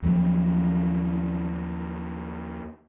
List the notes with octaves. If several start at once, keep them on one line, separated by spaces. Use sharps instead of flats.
D#2 F3 F#3